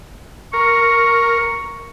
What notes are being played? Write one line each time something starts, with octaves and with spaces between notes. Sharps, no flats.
A#4 C#6